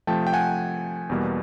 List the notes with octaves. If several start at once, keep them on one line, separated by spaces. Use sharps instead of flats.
C3 F3 A3 G5 A5
G5
F#5 G#5
E2 B2 G3 A#3